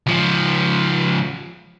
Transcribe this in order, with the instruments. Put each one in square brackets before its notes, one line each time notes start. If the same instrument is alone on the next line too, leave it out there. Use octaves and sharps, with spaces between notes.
[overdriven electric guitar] C#2 F3